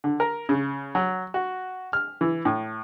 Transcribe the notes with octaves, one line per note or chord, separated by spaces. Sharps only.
D3
A#4
C#3
F#3
F#4
F6
E3
A2